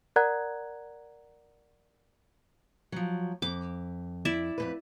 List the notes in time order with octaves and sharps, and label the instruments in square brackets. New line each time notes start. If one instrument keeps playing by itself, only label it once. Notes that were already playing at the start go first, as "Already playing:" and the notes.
[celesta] A#4 D5 F#5 A#5 F#6 G#6
[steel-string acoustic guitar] F3 F#3
[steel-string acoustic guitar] F2 [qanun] D6
[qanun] E4 D5 E5
[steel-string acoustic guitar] F2 B2 B4